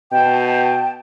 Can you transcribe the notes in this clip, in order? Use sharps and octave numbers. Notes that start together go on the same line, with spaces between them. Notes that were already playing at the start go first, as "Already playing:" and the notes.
B2 G5 A5